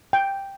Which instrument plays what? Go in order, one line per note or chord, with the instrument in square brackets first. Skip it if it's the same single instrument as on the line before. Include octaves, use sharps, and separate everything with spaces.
[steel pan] G5